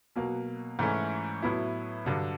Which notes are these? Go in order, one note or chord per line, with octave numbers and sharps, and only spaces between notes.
B2 F#3 A#3
G#2 E3 A3 C#4
A2 F#3 B3 E4
G2 D3 F#3